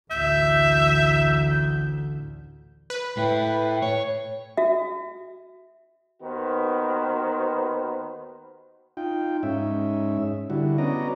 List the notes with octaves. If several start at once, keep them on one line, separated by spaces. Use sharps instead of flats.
A1 D2 E5 G6
B4
A2 E4 G5
C#5
F#4 E5
D#2 D#3 B3 F#4 B4 C5
D#4 F4 G5
G#2 C#4 D#4 E5
D3 G3 E4 F#4
B3 C#4 F#4 D5 D#5 A#5